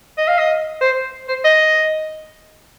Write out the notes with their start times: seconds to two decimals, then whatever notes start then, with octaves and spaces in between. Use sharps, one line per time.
0.18 D#5
0.28 F5
0.38 D#5
0.81 C5
1.28 C5
1.44 D#5